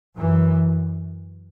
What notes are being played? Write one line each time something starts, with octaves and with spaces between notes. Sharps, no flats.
F#2 E3